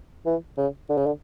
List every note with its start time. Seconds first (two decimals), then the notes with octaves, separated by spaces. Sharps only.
0.26 E3
0.57 C#3
0.89 D3
0.97 C#3
1.06 D3